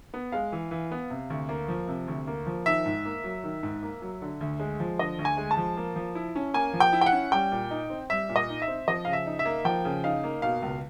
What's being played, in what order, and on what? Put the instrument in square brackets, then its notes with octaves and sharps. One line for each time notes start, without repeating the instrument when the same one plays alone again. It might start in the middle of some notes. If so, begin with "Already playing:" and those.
[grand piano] B3
[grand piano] G#3 [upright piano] F5
[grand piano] E3
E3
B3
C3
D2
A#3
F3
C3
D2
A#3
F3
[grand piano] D#3 [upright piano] E5
[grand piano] G#2
A#3
F#3
D#3
G#2
A#3
F#3
D3
D2
G#3
F3
[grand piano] D3 [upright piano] D#5
[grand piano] D2
[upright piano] G#5
[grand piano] G#3
[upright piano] A5
[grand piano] F3
A#3
F3
E4
C#4
[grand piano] A#3 [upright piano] G#5
[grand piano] F3
[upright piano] G5
[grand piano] E4
[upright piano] G5
F#5
[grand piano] C#4
[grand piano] G3 [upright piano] G5
[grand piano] A#2
D#4
C4
[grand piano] G3 [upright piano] E5
[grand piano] A#2
[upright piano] D#5
[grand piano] D#4
[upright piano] E5
[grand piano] C4
[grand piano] F3 [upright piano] D#5
[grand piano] C#3 [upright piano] F5
[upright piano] E5
[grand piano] D#4
[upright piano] E5
[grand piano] A#3
[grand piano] F3 [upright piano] G5
[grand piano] C#3
[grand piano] D#4 [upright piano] F5
[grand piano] A#3
[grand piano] B2 [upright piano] F5
[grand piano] C#2